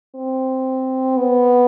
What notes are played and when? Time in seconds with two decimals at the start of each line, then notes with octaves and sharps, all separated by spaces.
0.15 C4
1.17 B3